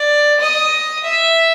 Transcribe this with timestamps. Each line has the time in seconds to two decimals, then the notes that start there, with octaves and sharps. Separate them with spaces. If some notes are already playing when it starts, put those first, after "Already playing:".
Already playing: D5
0.40 D#5
1.04 E5